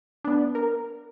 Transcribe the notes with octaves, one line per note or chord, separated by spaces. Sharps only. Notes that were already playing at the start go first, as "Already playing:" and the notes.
B3 D4
A#4